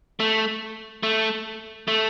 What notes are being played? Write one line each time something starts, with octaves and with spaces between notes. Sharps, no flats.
A3
A3
A3